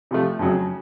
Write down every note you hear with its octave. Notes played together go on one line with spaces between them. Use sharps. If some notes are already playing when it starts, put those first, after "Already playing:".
C3 F3 A3
F2 C#3 F#3